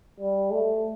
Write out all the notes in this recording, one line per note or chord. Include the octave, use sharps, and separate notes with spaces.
G3
A3